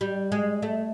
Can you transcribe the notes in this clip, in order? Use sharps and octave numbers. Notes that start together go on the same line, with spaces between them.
G3
G#3
A3